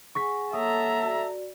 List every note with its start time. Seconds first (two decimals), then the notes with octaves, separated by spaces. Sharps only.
0.15 G#4 F#5 G#5 C#6 A#6 B6
0.53 A#3 A4 C#5 E5 F#5 A#5 D#6
1.03 F#4 D5